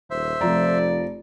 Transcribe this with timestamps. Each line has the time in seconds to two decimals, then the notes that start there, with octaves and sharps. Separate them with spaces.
0.10 D#1 C5 E5
0.41 F1 F2 F3 D5 A#5